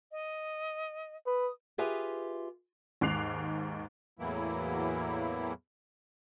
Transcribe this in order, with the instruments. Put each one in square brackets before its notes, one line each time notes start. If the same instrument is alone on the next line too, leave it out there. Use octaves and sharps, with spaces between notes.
[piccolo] D#5
[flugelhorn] B4 [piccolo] D#6
[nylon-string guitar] F4 G4 G#4 B4 E5
[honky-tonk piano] D#2 G#2 D6 F#6 C7 F7
[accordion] E2 A2 E3 F#3 A#3 E4